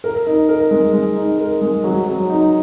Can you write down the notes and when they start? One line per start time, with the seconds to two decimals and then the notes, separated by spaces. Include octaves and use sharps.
0.04 A#4
0.27 D#4
0.49 A#4
0.71 G#3
0.93 G#3
1.16 D#4
1.39 A#4
1.61 G#3
1.84 F#3
2.07 F#3
2.30 D#4